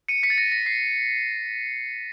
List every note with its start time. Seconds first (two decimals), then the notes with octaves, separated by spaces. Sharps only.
0.08 C#7 D#7
0.23 B6 C#7
0.30 A6
0.38 A#6
0.52 A#6
0.66 C7